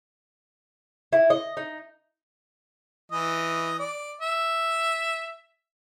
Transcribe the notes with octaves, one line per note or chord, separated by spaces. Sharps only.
E4
D#5
D#4
E3 D#5
D5
E5